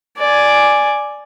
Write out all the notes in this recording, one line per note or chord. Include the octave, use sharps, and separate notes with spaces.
D5 G#5